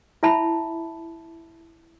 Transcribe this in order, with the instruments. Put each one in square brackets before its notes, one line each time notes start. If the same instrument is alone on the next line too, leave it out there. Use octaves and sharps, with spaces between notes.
[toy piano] E4 E5 A5 B5